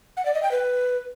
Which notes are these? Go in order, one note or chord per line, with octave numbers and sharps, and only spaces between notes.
F#5
D5
D#5
G5
B4